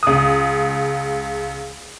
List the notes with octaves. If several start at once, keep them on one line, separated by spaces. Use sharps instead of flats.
C#2 D#6